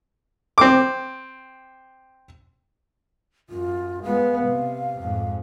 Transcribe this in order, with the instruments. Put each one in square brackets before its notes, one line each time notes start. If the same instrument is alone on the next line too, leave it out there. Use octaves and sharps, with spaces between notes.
[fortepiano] C4 D6
[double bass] F#2 [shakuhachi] F4
[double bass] G#3 B3 [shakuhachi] F5
[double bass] C3
F2 G#2